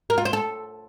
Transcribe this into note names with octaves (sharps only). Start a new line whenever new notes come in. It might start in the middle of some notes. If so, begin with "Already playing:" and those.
A#4
F4
C5
A4